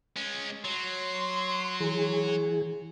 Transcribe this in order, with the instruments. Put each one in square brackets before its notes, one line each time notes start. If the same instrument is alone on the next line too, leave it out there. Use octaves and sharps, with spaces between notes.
[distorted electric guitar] G#3 C#4
[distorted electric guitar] F#3 [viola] C6
[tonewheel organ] E3 G#4